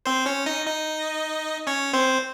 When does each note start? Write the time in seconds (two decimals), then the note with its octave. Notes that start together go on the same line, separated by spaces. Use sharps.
0.06 C4 C5
0.26 C#4 C#5
0.46 D#4 D#5
0.66 D#4 D#5
1.67 C#4 C#5
1.93 C4 C5